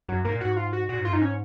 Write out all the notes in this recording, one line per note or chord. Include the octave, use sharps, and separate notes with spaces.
F#2 F#3
G#2 A#3
A#2
G#2 F#4
F4
F#4
A#2 F#4
G#2
F#2 F4
G#2 D#4
C#4